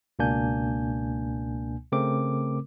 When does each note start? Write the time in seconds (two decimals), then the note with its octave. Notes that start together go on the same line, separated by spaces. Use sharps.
0.19 C#2 B2 A#3 D4 G#5 G6
1.92 C#3 A3 C4 A#4 D6